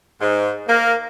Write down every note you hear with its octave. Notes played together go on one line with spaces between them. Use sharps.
G#2
A#3